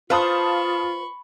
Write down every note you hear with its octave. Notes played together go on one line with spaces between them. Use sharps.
F4 B4 C5 F5 A5 B5 C#6 D#6